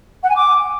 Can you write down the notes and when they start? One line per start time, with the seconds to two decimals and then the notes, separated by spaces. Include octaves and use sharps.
0.23 F#5
0.29 G#5
0.35 D6